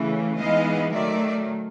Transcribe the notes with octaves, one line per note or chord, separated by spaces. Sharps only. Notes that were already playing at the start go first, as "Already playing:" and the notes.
Already playing: C#3 E3 A3
E3 G#3 B3 D#4 D#5 F5
D#3 F#3 A3 D5 E5